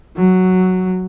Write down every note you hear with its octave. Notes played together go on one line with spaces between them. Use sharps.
F#3